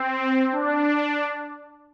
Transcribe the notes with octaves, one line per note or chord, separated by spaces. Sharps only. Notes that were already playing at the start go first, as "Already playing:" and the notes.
Already playing: C4
D4